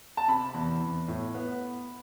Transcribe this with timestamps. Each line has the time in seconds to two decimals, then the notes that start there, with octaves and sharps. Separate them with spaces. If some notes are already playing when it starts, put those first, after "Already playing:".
0.17 A5
0.28 C3 B5
0.54 E2
0.81 E2
1.08 A2
1.34 B3